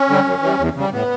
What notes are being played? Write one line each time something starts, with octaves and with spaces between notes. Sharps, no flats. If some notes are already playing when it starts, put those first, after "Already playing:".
Already playing: C#4
D3 G3
F#2
E3 G3
E2
C#3 G3
A2 B3